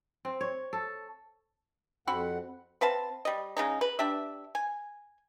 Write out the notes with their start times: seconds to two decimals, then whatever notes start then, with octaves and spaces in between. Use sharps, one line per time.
0.25 C4
0.41 C#5
0.73 A4
2.07 F2 C4 F#4 F#5 B5
2.81 C4 B4 F5 A5
3.25 G3 D#5
3.57 C#3 G#3 D#4
3.81 B4
3.99 D4 G4 E5
4.55 G#5